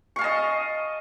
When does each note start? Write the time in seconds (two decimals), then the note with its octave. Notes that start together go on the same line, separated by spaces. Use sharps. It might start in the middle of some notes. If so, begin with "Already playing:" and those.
0.16 C#6
0.19 F5
0.21 A5
0.24 D#5